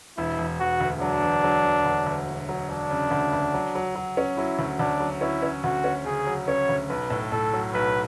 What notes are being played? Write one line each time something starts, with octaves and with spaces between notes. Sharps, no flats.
E1 E4
E1
E1 F#4
D2
F#3 D4
E1
F#3
E1
D2
D2
E1
F#3
F#3 D4
C#3
D2
D2
F#3
F#3
F#3
C#4
F#3 E4
D2
D2 D4
F#3
C#4 E4
C#4
D2 F#4
C#4
C#3 G#4
F#3
C#4 C#5
D2
B1 B4
A2
A2 A4
F#3
B1 B4